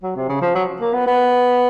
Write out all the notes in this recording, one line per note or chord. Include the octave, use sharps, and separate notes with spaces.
F#3
C3
C#3
F3
F#3
A#3
B3
B3